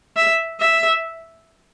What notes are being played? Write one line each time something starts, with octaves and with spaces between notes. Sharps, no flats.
E5
E5